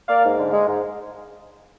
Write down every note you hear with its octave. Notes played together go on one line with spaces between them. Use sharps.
A#3 D5 F5
G#2
D3
G#3
G#2